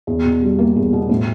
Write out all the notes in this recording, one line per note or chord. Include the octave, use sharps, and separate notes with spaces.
E2
B2
G3
A#3
E2
B2
A2